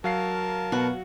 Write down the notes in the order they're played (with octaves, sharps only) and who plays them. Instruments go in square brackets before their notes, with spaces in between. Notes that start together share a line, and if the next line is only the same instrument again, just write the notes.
[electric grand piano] F#3 F5 C7 [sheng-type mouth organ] A#4 A5
[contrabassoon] B2 [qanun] F#4